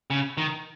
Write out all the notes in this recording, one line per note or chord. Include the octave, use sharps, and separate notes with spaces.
C#3
D#3